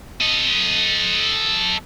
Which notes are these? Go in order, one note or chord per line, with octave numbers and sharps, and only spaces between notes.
A4 D#5